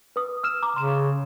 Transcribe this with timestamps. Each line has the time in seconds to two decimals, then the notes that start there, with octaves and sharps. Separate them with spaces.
0.16 B4 D#6
0.44 E6 F6 E7
0.63 A#5 D6
0.76 C#3 C6 E7